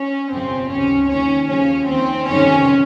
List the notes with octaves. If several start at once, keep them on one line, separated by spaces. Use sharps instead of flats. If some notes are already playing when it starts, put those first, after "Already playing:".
Already playing: C#4
G1 F2 C3 F3 C4
C#2 C3 D#3 C#4
D#2 D#3 C#4
D#2 C#3 F3 C#4
D#2 D#3 C4
G1 F2 C3 D#3 C#4